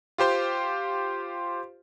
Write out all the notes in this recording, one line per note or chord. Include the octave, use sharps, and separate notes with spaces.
F4 G4 C5 C6